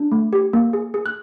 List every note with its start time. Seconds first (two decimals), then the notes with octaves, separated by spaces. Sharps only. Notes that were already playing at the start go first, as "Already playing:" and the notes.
Already playing: D4
0.12 A3
0.33 G4
0.53 A#3
0.73 G#4
0.94 G#4
1.06 F#6